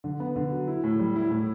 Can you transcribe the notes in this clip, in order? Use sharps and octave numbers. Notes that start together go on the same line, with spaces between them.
D3
B3
D3
F#3
E4
A2
G3
E4
A2